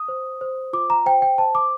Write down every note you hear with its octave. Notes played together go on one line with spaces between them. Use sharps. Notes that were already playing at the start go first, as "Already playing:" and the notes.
Already playing: D#6
C5
C5
F4 D6
A#5
C5 G5
G5
C5 A5
D6